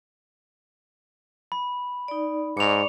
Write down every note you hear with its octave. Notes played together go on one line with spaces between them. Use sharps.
B5
D#4 D5
G#2 D5 C#6 D6 C#7 F7